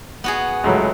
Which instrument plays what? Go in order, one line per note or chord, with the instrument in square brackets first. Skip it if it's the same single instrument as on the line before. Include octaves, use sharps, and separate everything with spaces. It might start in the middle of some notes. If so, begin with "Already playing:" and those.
[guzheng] B3 F#4 G#4 [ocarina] F#5
[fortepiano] C#2 A2 F#3